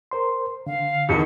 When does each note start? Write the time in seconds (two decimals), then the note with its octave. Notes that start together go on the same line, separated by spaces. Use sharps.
0.11 A#4 C5 C6
0.67 D3 F5
1.09 E2 B2 D#3 C#7